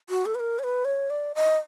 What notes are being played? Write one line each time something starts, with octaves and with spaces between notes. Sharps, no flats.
F#4
A4
B4
A#4
C#5
B4
C#5
D5
D#5